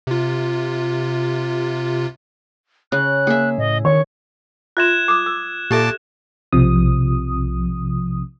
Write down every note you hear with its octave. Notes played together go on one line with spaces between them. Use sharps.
C3 F4
C#3 F#6
A#3 G#4 E5
A2 D#5
D#3 C#5 C#6
F4 E5 C6 F#6 G#6 E7
D6 D#6
E6
A#2 G4 A4 E5 A5 D6
B1 C3 F3 D#6